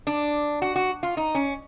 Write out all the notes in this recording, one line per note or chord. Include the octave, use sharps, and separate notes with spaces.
D4
F#4
F#4
F4
D#4
C#4